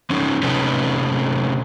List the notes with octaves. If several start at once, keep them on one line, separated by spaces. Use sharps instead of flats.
F3 C#4 D#4
A2 C3 C#4 D#4 A4 B4